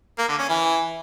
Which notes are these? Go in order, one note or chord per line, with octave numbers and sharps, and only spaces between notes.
A#3
D3
C#4
E3